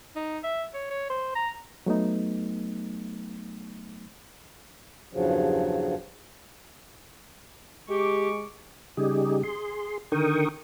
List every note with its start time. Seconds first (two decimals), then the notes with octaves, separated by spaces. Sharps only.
0.16 D#4
0.44 E5
0.74 C#5
0.90 C#5
1.10 C5
1.35 A#5
1.86 F#3 A3 B3 D#4
5.13 E2 G2 C#3 F3 F#3
7.89 G#3 G4 C#6 D6
8.97 C#3 G3 D#4 G4 G#4
9.43 G#4 C6
10.12 D3 D#3 A#4 G5 C#6 D#6